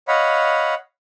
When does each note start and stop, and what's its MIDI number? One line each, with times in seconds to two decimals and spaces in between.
0.08 0.75 73
0.08 0.75 75
0.08 0.75 77
0.08 0.75 78
0.08 0.75 83